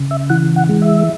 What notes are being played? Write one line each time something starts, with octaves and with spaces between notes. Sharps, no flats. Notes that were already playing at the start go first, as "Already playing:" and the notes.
Already playing: C#3
E5
E3 F#5
F#5
G#3
E5